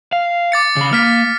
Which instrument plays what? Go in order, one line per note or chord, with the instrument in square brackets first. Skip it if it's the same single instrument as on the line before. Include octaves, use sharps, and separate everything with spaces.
[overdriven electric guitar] F5
[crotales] D6 A6 C#7
[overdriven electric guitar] C#3 B5
[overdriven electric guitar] A#3 [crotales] F6 B6